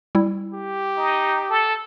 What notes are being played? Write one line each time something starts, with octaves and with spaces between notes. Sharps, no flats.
G3 E4
G4
D#4
A4